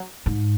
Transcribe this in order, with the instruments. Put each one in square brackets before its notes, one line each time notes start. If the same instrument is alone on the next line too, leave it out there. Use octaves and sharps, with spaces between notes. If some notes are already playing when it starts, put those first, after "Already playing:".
Already playing: [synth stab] F#3
[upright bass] G#2